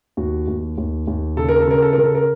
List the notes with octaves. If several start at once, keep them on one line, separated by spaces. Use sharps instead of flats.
D#2 F#4
D#2
D#2
D#2
C#3 A4
A#4
A4
C#3 A#4
A4
A#4
C#3
A4
A#4